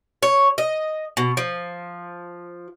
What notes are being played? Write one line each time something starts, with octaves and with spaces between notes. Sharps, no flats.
C#5
D#5
B2
F3